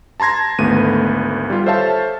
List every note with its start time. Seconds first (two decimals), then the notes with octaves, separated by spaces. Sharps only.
0.20 A5 A#5 C6 G#6 A#6
0.59 G#1 D2 A3 B3 D#7
1.50 G3 F4
1.66 A4 C5 C#5 E5 F5 A5